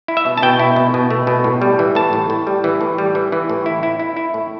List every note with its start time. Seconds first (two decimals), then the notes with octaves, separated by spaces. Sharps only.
0.08 E4
0.17 E5
0.26 B2
0.38 A5
0.42 B2 G5
0.59 E4
0.76 B2
0.94 B2
1.11 A3
1.27 B2
1.44 A2
1.62 G3
1.79 E3
1.95 A2 A5
2.13 A2
2.30 A2
2.47 G3
2.64 E3
2.81 A2
2.98 G3
3.15 E3
3.32 E3
3.50 A2
3.66 E4
3.83 E4
4.00 E4
4.17 E4
4.34 A2